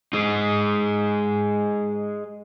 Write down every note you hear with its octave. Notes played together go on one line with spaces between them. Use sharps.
G#3 D#4